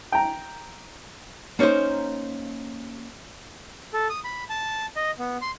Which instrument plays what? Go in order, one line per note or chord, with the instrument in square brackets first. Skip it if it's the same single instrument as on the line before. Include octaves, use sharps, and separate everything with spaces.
[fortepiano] G5 A#5
[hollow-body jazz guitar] A#3 C#4 D#4 A#4 C5
[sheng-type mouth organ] A4
D#6
B5
A5
D#5
B3
C6